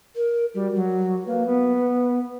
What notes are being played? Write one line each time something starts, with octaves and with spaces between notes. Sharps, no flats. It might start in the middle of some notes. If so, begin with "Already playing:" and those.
A#4
G3 F#4
F#3
A#3 B4
B3